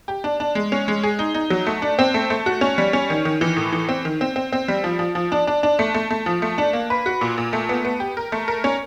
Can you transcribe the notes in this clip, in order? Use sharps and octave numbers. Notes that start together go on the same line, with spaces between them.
G4
D4
D4
G#3
C#4
G#3
G#4
D#4
D#4
F#3
A3
D4
C4
A3
A3
F#4
C#4
G3
C#4
D#3
D#3
E3
A2
E3
C4
D#3
C4
C4
C4
G3
F3
F3
F3
D4
D4
D4
A3
A3
A3
F3
A3
D4
A#3
B4
F#4
A#2
A#2
A3
B3
B3
G4
A#4
A3
A#4
C#4